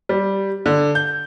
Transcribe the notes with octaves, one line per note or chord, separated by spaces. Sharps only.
G3
D3
G6